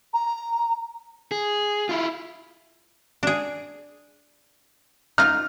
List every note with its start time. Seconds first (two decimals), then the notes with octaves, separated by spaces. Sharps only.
0.14 A#5
1.31 G#4
1.89 E4 F4
3.23 D4 G#4
5.18 D#4 F4 F6